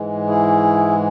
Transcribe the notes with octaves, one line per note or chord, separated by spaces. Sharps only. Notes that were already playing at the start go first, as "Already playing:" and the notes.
Already playing: G#2 E3 G#3
E4 G#4